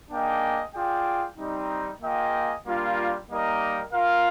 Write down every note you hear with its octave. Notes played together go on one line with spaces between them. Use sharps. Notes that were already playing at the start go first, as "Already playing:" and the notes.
A#3 D4 G#4 D#5 G5
F4 G#4 D5 G5
G3 C4 D#4
A#3 F4 G#4 D#5 G5
G3 A#3 D4 F4
G3 A#3 D#4 A#4 D#5
F4 A#4 F5